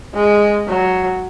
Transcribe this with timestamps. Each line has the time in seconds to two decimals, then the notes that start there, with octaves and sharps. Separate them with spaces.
0.14 G#3
0.67 F#3